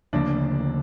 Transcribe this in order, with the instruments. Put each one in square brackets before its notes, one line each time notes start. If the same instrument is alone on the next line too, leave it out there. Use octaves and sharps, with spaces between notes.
[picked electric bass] D2 C#3 F3 A#3 [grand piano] D4